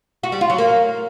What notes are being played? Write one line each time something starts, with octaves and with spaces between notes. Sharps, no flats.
F#4
G3
F4
F#3
A#3